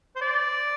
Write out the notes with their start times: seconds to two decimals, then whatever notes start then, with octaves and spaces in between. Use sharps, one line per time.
0.16 C5
0.21 D5